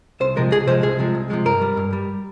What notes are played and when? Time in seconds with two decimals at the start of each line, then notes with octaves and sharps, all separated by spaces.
0.20 C2 C5
0.36 C3 F3 G#3 A#4
0.52 C2 G#4
0.67 C3 F3 G#3 C5
0.83 C2 G#4
0.99 C3 F3 G#3
1.15 C2
1.30 C3 F3 G#3
1.45 G2 A#4
1.62 G3
1.77 G2
1.93 G3